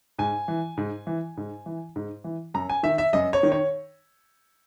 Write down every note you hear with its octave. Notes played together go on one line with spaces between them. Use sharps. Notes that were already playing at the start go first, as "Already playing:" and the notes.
G#2 G#5
E3
G#2
E3
G#2
E3
G#2
E3
F#2 A#5
G#5
D#3 E5
E5
F#2 D#5
C#5
D#3
C#5